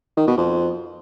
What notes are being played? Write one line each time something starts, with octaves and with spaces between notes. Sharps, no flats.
D#3
B2
F2